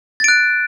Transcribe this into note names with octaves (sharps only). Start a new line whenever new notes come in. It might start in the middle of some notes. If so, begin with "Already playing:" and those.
F#6 A6 D7